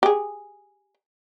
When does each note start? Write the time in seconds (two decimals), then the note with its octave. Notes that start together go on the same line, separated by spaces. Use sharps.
0.03 G4 G#4